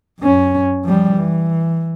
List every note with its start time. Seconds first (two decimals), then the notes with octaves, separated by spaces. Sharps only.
0.20 F#2 C#4
0.84 F3 G3
1.16 E3